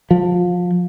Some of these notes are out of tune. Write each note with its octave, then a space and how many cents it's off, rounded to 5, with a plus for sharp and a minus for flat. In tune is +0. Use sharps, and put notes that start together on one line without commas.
F3 +25